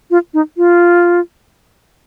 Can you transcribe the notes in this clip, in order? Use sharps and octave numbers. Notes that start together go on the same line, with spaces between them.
F4
D#4
F4